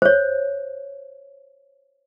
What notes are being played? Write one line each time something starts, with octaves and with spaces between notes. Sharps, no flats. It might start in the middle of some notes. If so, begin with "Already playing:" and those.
C5 C#5